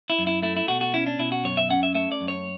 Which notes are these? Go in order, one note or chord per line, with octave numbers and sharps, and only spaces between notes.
E4
F#2
E4
A3 E4
E4
B2 F#4
F#4
C#4 E4
D4
B2 E4
F#4
F#2 C#5
E5
C#4 F#5
E5
A3 E5
D5
F#2
C#5